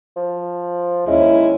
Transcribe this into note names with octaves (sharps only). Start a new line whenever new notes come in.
F3
D#2 G#3 C#4 E4